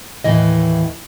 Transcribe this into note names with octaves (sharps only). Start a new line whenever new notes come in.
D#2 A2 E3 D#5